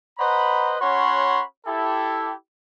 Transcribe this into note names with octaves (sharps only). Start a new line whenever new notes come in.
B4 C5 D#5 F#5 A#5 B5
C#4 F#4 C#5 F#5 B5 C6
E4 G4 A4